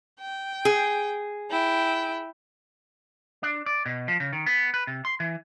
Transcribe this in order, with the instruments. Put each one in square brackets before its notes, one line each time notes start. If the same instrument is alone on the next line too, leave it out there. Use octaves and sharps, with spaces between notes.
[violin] G5
[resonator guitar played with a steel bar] G#4
[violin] E4 G5
[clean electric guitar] D4
D5
B2
F3
C#3
D#3
B3
B4
C3
C6
E3